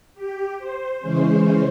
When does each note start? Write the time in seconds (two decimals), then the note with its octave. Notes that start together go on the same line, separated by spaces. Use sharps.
0.14 G4
0.58 C5
1.01 C#3 E3 G#3 C#4 C5